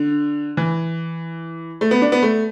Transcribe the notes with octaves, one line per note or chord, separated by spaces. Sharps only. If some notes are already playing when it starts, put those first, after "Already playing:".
Already playing: D3
E3
A3
B3
D4
B3
A3